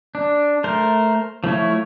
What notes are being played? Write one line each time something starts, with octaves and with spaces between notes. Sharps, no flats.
D4
A3 A#4 C5
F3 A3 E4 C#5